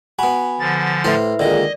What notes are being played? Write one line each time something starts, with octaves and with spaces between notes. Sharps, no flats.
B3 F#4 G#5 B5
D3 F3 A6
A2 E4 B4 C5 E5
A#2 D3 D#3 G#3 D5 D#5